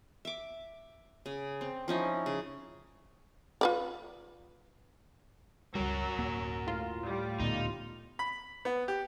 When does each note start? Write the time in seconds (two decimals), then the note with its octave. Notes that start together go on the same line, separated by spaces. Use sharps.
0.25 E5 D6
1.26 C#3
1.61 C4
1.88 F3 C#4 D#4 E4
2.26 C#3
3.61 F4 B4 D5
5.75 C#2 F#3 G3 F#4 A#4
6.18 D1 A#3
6.67 A2 F4
7.06 G3
7.40 D2 A#2 B3 D#4
8.19 B5
8.65 B3
8.88 G4